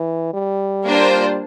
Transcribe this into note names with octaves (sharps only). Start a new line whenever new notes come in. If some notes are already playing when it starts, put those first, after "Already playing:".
Already playing: E3
G3
A#3 D4 F4 C5